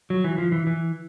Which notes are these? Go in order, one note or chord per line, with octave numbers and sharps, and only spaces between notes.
F#3
E3
F3
E3
E3